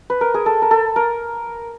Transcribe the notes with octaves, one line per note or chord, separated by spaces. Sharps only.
B4
A#4
G#4
A4
A#4
A4
A#4